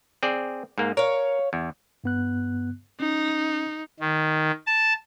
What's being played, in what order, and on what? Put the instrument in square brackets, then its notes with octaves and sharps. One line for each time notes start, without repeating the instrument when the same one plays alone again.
[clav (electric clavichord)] C4 G#4 D5
G#2 A#3
[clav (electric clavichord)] A#4 [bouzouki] C#5 F5
[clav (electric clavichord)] E2
[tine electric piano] G2 B3 F#6
[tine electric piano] C#4 [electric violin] D#4
[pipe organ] D#3
A5